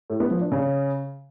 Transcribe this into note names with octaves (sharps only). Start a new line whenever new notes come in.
A2
B3
F3
D4
C#3